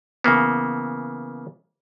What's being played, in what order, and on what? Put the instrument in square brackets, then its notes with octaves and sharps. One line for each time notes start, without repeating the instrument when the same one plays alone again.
[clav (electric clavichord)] C#3 E3 A#3 B3